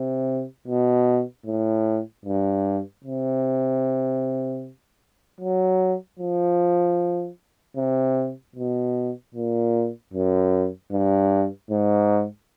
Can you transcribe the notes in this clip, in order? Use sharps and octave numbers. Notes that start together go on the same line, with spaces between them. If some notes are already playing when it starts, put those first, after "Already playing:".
Already playing: C3
B2
A2
G2
C3
F#3
F3
C3
B2
A#2
F#2
G2
G#2